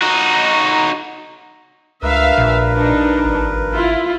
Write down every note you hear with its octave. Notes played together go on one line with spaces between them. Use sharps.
D#4 F#4
C#2 G2 A#4 B4 E5 F5
A#1 A#2
D4 D#4
G#1
E4 F4